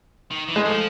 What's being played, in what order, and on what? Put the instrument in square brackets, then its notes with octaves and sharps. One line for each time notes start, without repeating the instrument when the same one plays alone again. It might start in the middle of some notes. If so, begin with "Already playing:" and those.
[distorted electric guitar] D#3
E3
[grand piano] G#3
[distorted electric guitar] F3 [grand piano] A3